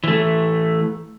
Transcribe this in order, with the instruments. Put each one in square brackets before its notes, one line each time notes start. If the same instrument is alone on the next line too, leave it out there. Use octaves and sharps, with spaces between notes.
[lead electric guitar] E3 A3